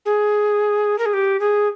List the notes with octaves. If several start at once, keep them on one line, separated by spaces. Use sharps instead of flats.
G#4
A#4
G#4
G4
G#4